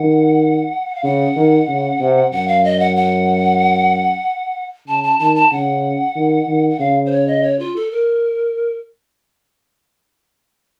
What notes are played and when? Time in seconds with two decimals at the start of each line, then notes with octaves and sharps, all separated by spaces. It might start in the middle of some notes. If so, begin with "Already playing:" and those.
Already playing: D#3 F#5
0.95 F5
1.04 C#3 F#5
1.36 D#3
1.68 C#3
2.00 C3
2.32 F#2 F#5
2.48 F5
2.64 D#5
2.80 F#5
2.96 F#5
4.88 C#3 A5
5.04 A5
5.19 D#3 A5
5.35 A5
5.52 C#3 F#5
6.16 D#3
6.47 D#3
6.70 F#5
6.79 C#3 F5
7.06 C5
7.11 C#5
7.27 D#5
7.43 C#5
7.59 F4
7.76 A4
7.91 A#4